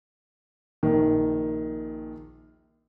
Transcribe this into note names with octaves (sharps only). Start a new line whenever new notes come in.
A#1 D#3